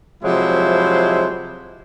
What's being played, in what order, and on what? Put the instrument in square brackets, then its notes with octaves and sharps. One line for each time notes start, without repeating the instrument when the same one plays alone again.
[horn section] C3 F3 F#3 G#3 E4 C5